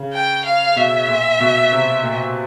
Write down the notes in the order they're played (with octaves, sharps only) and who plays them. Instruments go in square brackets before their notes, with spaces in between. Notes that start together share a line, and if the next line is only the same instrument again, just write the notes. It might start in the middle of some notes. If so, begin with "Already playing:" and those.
Already playing: [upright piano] C#3
[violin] G5
F5
[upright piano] B2 [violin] E5
[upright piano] A#2
B2
C3
A#2